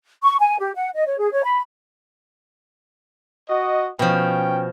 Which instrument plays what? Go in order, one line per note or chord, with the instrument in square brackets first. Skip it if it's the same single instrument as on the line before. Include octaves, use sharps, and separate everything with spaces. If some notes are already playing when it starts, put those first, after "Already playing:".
[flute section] C#6
G#5
G4
F#5
D#5
C#5
G#4
C#5
B5
[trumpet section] F#4 D#5
[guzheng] B2 F3 [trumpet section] C#4 G5